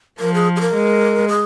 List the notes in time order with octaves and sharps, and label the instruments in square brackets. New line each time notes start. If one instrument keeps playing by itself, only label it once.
[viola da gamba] F3 [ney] A#4
[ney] G#4
G#4
A#4
[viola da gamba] G#3
[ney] G#4